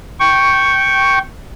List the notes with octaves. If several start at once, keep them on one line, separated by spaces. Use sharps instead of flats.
G5 C#6